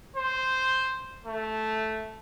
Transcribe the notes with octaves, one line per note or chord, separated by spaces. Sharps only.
C5
A3